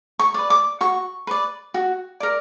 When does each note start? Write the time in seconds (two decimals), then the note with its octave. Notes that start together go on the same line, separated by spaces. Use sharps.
0.19 C#6
0.34 B4 D5
0.50 D6
0.81 F#4 C#6
1.27 B4 D5
1.74 F#4
2.20 A#4 D5